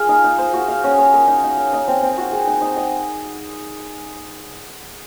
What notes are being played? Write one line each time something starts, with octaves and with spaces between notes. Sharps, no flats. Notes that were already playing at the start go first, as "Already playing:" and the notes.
Already playing: F4 G#4 A#4 F5
D#4
D#4
C5
F#4
F5
C#4
C#5
A#4
D#4
D#4
F5
D#4
C4
C4
F#4
G#4
D#4
D#4
D#5